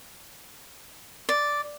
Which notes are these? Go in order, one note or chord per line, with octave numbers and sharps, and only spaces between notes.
D5